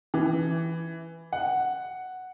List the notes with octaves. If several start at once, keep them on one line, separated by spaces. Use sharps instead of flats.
E3
F#5